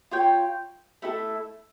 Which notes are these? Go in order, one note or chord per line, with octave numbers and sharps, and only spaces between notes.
F4 C#5 G5
A3 E4 A4